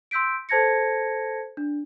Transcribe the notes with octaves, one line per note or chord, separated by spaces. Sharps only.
C6 E6 G6 B6 D7
A4 C5 A5 G#6 A#6 C#7
D4